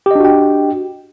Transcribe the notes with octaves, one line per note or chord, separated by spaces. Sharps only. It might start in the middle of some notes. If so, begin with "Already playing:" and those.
D4 F#4 G4 D#5 G5